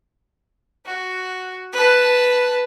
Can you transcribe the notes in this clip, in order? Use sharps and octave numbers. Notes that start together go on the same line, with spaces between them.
F#4
B4 A5